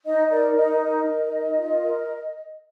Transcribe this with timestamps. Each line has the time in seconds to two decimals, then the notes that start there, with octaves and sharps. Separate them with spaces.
0.06 D#4 D#5
0.31 A#4 D5
0.56 D#4 D#5
0.81 A#4 D#5
1.06 D#4
1.32 A#4
1.57 F4
1.82 A#4